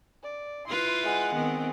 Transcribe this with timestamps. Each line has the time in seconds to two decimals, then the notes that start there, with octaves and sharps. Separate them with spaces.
0.23 D5
0.67 E4 F4 B4 C6
1.03 G#3 F#5
1.34 D#3 B3 C4